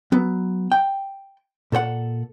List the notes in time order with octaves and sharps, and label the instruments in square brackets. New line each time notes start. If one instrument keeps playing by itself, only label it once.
[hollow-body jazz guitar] F#3 B3
G5
A#2 A4 C5 F#5